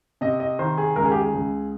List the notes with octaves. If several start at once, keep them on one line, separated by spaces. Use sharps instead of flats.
C3 D#5
D#5
D#3 C5
G#4
C#2 A#4
G#4
G4
G#4
C#2